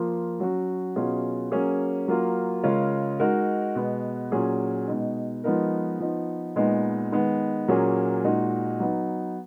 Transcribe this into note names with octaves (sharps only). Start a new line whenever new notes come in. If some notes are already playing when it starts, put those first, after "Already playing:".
Already playing: F3 A#3 F4
F#3 C#4 F#4
B2 F#3 C#4 F4 G#4
F#3 A#3 C#4 G#4
F#3 A#3 F4
C#3 G#3 C#4 F4 A#4
G#3 D#4 F#4 A#4
B2 G#3 B3
A#2 F#3 C#4 G#4
B2 G#3 D#4
F3 G#3 B3 D#4 A#4
F3 B3 D#4
A#2 G#3 B3 D#4
D#3 G#3 B3
A#2 F#3 A#3 C#4 G#4
A#2 G#3 D#4 F#4
F#3 B3 D#4